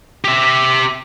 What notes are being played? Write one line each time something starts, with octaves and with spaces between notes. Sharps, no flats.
G4 E5